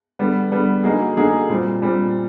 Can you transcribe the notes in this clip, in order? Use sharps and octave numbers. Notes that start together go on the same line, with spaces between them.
D3 G3 B3
D3 G3 B3
D3 F#3 A#3 D#4 G#4
D3 F#3 A#3 D#4 G#4
A#2 G3 C4
A#2 G3 C4